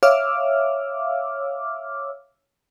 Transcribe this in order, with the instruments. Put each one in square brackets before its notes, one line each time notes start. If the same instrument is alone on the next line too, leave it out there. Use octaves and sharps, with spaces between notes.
[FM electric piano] C#5 E5 F5 D6 E6 F6